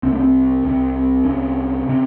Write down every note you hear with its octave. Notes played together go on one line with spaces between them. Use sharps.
C2 C3 C4
A3
C4
C2 C3
C2 C3 C#4
C3